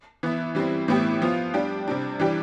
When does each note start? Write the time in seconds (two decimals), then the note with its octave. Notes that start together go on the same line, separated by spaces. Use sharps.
0.23 E3 B3 E4
0.55 E3 G3 C4 E4
0.88 A2 E3 B3 E4 G4
1.22 F3 B3 F4
1.54 G3 D4 G4
1.88 C3 G3 D4
2.20 E3 G3 D4 G4